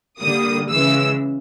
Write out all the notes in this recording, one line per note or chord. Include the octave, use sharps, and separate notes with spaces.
D3 G3 A#3 D#6
C#3 E3 G#3 E6